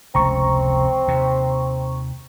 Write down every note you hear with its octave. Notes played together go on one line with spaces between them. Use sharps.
F1 C#2 C#3 C4 A#5 C#6
D#2 C3